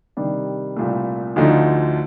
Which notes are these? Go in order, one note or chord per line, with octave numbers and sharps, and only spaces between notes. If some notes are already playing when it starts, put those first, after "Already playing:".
C3 D#3 G3 D4
C2 A#2 A3
D2 D3 F3 A3 D#4